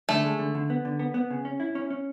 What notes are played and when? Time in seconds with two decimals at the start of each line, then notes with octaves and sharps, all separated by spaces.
0.09 D3 A3
0.24 G#3
0.39 D3
0.55 D3
0.70 B3
0.85 D3
0.99 B3
1.14 B3
1.31 C#3
1.45 C#4
1.60 E4
1.75 C#4
1.90 C#4